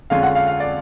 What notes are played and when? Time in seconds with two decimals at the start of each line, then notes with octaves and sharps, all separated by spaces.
0.10 F2 D3 G#3 C#4 F4 F5
0.23 F#5
0.35 F5
0.48 F5
0.60 D5